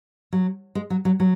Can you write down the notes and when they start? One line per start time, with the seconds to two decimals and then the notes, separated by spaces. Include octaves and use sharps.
0.33 F#3
0.75 G#3
0.90 F#3
1.05 F#3
1.20 F#3